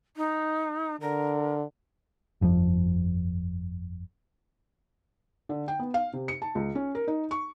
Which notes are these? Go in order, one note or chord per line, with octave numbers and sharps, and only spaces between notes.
D#4
D3 A#4
G1 F2 C#3 F3
D3
G5
B3
F5
C3
C#7
A5
C#2
C#4
A#4
D#4
C#6